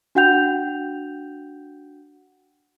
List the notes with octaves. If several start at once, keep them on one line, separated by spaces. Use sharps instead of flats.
D4 F#4 F#5 G5 G6 F7